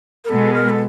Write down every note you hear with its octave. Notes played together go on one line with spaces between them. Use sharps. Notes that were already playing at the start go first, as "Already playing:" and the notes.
A#4
B2 G#3 B3 A4
A#4
A4